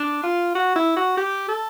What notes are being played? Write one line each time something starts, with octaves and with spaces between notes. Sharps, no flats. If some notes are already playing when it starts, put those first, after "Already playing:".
Already playing: D4
F4
F#4
E4
F#4
G4
A4